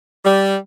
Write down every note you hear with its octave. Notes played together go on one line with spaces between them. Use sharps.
G3